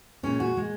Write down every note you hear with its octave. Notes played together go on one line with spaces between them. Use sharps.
A#2 G#3 C#4
F#4
A#2 G#3